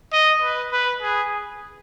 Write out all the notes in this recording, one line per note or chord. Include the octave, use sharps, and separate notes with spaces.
D#5
B4
B4
G#4